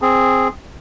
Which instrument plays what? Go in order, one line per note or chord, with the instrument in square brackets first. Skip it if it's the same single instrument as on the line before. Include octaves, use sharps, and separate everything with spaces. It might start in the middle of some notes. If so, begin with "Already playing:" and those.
[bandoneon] C4 G#4